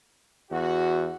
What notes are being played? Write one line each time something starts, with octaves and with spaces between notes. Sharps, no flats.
E2 F#4